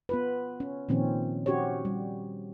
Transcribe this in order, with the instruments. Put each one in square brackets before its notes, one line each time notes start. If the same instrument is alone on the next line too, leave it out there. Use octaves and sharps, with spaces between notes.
[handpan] B3 F4 B4
C#4
A#2 D#3 F3 C4 C#4
C#4 F#4 G4 C5 C#5
G3